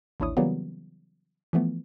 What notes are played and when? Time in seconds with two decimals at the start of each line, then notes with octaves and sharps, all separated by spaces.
0.20 A1 D#2 D4 E4 C#5 D#6
0.37 C#3 E3 F#3 G3 A#3 B3
1.53 E3 F3 A3 B3